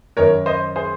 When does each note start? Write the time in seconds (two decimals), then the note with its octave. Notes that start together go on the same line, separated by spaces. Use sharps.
0.17 F#2 D#3 A#4 C#5
0.46 C5 D#5
0.76 G#4 C5